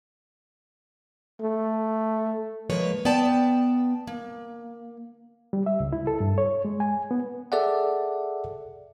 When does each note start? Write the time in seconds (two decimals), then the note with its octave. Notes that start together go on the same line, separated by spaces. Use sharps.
1.41 A3
2.70 F3 G#3 A#3 B4 C#5
3.05 B3 D5 G5 A5
4.07 A#3
5.53 G3
5.66 E5
5.80 C#2
5.93 E4
6.07 A4
6.20 G2
6.38 C#5
6.65 G#3
6.80 G#5
7.11 B3
7.52 G#4 A4 D5 E5 F#5